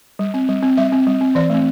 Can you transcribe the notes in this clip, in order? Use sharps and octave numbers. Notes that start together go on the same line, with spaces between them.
G3
C4
G3
C4
G3 E5
C4
G3
C4
E3 D5
A3 C4